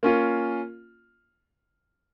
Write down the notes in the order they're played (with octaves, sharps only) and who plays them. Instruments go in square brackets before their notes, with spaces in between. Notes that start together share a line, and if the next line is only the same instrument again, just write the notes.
[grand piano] A#3 C#4 F4